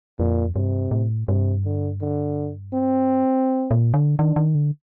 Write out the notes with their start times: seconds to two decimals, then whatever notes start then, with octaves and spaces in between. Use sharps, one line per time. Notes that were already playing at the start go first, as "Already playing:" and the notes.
0.19 F2 A#2
0.56 G2 C3
0.91 A2
1.28 G2 C3
1.65 D3
2.01 D3
2.74 C4
3.71 A#2
3.94 D3
4.19 D#3 D4
4.36 D#3
4.55 D3